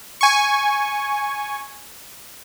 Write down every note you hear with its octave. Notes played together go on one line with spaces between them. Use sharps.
G#5 C#6